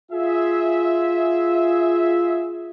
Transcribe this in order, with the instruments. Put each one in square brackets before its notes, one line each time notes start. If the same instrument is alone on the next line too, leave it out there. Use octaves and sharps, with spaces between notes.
[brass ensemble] F4 G#4 E5